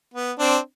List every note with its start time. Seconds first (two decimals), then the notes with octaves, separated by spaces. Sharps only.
0.14 B3
0.39 C4 D4